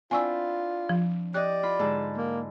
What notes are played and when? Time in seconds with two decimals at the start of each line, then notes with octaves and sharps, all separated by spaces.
0.11 C4 D4 E4 F4 G#5 C#6 E6
0.89 F3
1.34 G4 D5 D#5 F#6
1.63 F4 B5
1.79 G#2 D3 A5
2.17 A#3